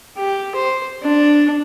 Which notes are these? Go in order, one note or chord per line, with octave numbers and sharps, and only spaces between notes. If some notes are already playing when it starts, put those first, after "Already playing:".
G4
C5
D4